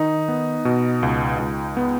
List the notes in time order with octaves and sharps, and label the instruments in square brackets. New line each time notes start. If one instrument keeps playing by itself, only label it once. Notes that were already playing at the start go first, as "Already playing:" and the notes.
Already playing: [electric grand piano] D#3 [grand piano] D#4
[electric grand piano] B3
B2
C#2
C#2
B3